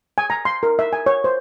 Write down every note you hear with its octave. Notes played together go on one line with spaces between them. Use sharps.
G#5
A#5
C6
A#4
E5
G#5
C#5
C5